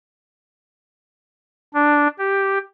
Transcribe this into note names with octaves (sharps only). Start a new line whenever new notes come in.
D4
G4